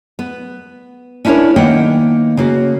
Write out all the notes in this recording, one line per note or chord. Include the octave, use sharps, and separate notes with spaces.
B3
C#4 D4 E4 F#4 A#4 C#5
D#3 A#3 B3 F#5 G5
C#3 A#3 F#4